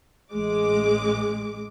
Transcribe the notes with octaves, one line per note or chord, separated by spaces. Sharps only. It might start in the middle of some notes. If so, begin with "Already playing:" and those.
A1 G#3 D6